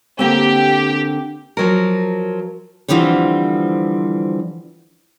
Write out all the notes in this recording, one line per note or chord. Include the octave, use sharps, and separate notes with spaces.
D3 A#3 C4 G4
F3 F#3 A#4
D3 E3 F3 G3 C4